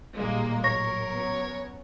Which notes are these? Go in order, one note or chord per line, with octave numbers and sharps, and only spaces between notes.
A1 A#2 D#3 G3 G#3 A#3
F#3 A#4 C#5 C#6 A#6
B3 C#4